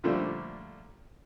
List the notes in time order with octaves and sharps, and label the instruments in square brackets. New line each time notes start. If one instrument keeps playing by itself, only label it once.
[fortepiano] A#2 D3 F3 G3 A3